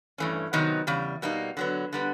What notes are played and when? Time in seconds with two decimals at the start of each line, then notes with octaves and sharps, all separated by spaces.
0.18 G2 E3 A3 C#4
0.53 C3 D#3 F#3 B3 D#4
0.87 E2 C#3 G3
1.22 B2 G3 A#3 D#4
1.57 D3 F#3 B3
1.93 D3 G3 B3